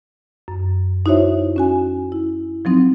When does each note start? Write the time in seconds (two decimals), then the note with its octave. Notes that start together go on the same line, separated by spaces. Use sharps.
0.48 F#2
1.06 D#4 E4 F#4 C5 C#5 E5
1.56 C#4 F#4 G#5
2.12 E4
2.65 F3 F#3 C4 D#4